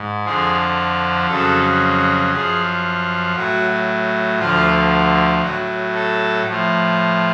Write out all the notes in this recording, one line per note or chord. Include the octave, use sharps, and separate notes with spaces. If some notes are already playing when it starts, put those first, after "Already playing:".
Already playing: G#2
F2 D3 F3 G#4
F2 C#3 F#3 A4
F#2 F3 G#4
A2 F#3 F#4
D2 D3 F3 F4
A2 F#3 F#4
A4
A2 F3